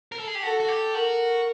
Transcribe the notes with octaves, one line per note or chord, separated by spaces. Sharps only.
A#4
A4
G#4
G4
F#4 A4
F#4
G4
F#4 A#4